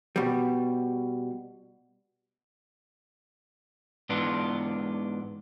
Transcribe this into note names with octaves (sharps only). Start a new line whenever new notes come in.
B2 G3
G#2 E3 B3 D4 F4